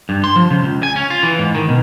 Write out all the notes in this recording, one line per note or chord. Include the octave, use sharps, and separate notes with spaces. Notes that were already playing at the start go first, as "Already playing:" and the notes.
G2
C6
F3
C#3
C#2
G#5
C#4
F4
E3
G#2
D#3
B2